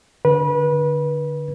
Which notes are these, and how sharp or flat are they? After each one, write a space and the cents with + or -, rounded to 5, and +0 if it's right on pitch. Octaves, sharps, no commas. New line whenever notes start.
D3 +0 B4 -25